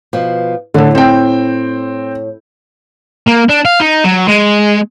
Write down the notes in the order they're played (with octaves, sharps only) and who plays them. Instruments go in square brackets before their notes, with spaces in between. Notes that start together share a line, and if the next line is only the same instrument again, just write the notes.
[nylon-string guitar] B2 F3
[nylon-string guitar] A2 [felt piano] D3 A4
[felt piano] C4 G5
[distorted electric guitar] A#3
D4
F5
D#4
F#3
G#3